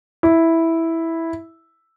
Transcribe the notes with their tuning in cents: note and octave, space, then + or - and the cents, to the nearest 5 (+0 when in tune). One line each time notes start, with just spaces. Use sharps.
E4 -5